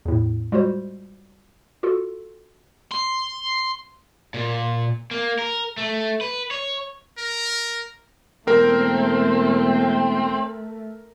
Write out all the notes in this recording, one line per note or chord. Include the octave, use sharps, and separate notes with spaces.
E2 A2
G3 G#3 F4 F#4 C5
F4 F#4 A4
C6
A#2
A#3
A#4
A3
B4
C#5
A#4
E1 A3 C4 A#4 A#5